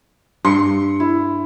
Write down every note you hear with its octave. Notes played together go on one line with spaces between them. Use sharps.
G2 C6 C#7
E4